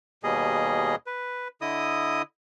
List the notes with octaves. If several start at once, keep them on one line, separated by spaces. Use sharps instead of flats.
D#2 B2 G3 G#4 D#5
B4
D3 E4 D#5 D#6